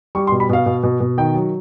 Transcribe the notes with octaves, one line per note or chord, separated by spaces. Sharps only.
G3 C#6
C6
B2
B5
B2 F5
B2
B2
B2
D#3 G5
F#3